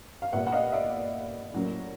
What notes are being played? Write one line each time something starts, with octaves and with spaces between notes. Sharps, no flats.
F5
A#2 G3 B3 E5 F#5
F#5
D#5 F5
D5 E5
A2 F#3 A#3 C#4